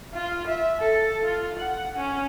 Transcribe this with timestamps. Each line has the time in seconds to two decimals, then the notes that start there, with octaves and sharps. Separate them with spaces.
0.14 F4
0.48 E5
0.79 A4
1.24 F4
1.59 F#5
1.97 C#4